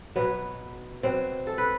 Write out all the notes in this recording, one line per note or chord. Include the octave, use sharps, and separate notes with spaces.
B2 F#3 B3
B2 F#3 C4
A4
B4